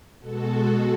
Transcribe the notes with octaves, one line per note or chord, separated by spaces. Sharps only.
B2 G#3 F#4 A4